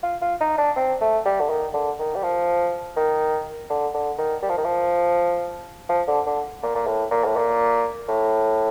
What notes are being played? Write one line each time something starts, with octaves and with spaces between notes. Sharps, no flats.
F4
F4
D#4
D4
C4
A3
G3
D3
D#3
D3
D#3
G3
F3
D#3
D3
D3
D#3
G3
F3
D#3
F3
F3
D3
D3
A#2
A#2
A2
A#2
A2
A#2
A2